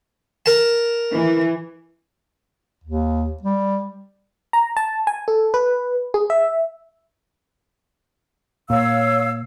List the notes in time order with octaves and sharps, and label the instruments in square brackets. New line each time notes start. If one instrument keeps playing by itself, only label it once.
[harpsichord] A#4 A5
[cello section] E3
[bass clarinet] D#2
G3
[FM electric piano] A#5
A5
G#5
A4
B4
G#4
E5
[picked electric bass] A#2 [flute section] C#5 F5 E6